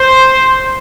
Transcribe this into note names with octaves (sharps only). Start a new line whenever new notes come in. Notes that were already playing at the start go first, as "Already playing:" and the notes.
Already playing: C5